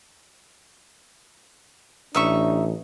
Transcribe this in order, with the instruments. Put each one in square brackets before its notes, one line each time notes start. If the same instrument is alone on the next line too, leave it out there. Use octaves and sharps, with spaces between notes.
[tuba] A1 [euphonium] D4 [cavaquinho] D#4 E5 C#6